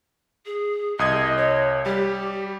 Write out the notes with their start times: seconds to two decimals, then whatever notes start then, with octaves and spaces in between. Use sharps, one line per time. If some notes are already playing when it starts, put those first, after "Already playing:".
0.46 G#4
0.99 C2 D#5 D#6 G#6
1.37 C#5
1.86 G3 G4